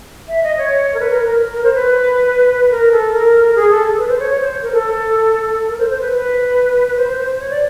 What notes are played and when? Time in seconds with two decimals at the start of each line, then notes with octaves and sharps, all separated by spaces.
0.28 E5
0.43 D#5
0.57 C#5
0.94 A#4
1.00 B4
1.10 A#4
1.21 A#4
1.53 A#4
1.64 C5
1.74 B4
2.70 A#4
2.92 A4
3.13 A#4
3.55 G#4
3.70 A4
3.98 B4
4.09 C5
4.19 C#5
4.30 C#5
4.41 C5
4.62 A#4
4.73 A4
5.69 A#4
5.79 C5
5.90 C5
6.01 B4
6.12 B4
6.88 B4
6.97 C5
7.18 C5
7.40 C#5
7.50 D5